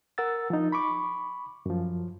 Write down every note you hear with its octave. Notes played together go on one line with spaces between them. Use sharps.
A#4 F#5 E6 A6
F3 D#4
B5 C#6 D6
F#2 F3